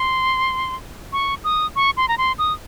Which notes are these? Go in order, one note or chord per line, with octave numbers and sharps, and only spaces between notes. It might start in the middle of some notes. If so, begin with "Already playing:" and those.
Already playing: C6
C#6
D#6
C#6
C6
A#5
C6
D#6